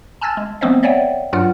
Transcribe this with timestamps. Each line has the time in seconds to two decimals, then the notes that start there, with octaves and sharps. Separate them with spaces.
0.21 G#5 A5 E6 F6 G#6 A6
0.37 G#3
0.61 F3 A3 B3 C4 C5 D#5
0.83 C#5 D5 E5 F#5 G5
1.33 G2 F#3 F4 F#5 F6